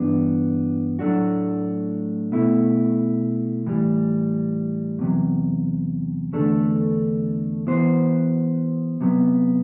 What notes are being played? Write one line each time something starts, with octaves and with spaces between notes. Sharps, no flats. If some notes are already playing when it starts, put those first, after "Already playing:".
Already playing: G2 E3 G3 B3 D4
A2 F#3 A3 D4 F#4
B2 A3 E4
A2 E3 G3
E2 C3 F#3
E2 D3 A3 D4 A4
E3 B3 F#4 C5
C3 F#3 B3